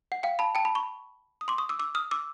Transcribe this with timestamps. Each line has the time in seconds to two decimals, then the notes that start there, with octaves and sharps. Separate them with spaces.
0.12 F#5
0.23 F5 G5
0.39 A5 B5
0.55 G5 A5
0.65 A5 B5
0.75 B5 C#6
1.41 D#6
1.48 C6 D6
1.58 C#6 D#6
1.69 D6 E6
1.79 D6 E6
1.95 D#6 F6
2.11 D6 E6